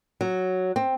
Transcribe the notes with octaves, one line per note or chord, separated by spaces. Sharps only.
F#3
C4